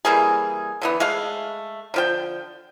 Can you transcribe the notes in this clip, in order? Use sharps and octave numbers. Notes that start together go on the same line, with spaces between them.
E3 G3 A#3 G#4
D3 E3 B3
G#3 A3 F5
D3 F3 G5